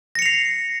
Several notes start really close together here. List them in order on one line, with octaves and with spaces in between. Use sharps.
A#6 C#7 F7 C7